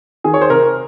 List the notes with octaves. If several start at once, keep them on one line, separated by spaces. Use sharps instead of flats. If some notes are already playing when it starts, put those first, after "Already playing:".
D#3 G#4
C#5
C5
C3 A#4